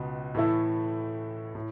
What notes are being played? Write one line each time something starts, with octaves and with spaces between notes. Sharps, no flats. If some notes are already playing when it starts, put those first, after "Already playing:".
Already playing: C#2 B2
A2 E3 A3 E4 A4
A2